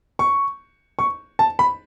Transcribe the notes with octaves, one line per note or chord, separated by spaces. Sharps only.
C#6
C#6
A5
B5